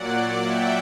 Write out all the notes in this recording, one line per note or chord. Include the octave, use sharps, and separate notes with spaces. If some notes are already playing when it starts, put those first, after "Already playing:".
Already playing: A#2 F#3 D5 F#5
D5 F#5
E5 G5